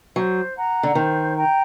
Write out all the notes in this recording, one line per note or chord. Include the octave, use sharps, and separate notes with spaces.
F#3 C5
F#5 A#5
D3
D#3 C5
G5 A#5